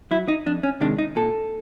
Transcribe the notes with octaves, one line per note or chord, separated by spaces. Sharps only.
F#3 E4
D#4
F2 D4
C#4
C3 D#3 G#3 D4
D#4
A#2 A4